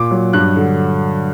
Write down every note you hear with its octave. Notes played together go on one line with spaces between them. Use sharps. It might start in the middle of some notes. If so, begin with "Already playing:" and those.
Already playing: A#2 D6
F#3
G2 F#6
D3